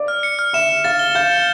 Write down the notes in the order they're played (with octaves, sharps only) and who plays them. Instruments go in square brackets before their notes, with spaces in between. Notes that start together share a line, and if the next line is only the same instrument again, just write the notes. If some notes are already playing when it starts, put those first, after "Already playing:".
Already playing: [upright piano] D5
[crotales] F6
C#7
F6
[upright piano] E5 [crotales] E7
[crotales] E7
[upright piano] F5 [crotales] A6
[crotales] G7
[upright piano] F5 [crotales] G6
[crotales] C#7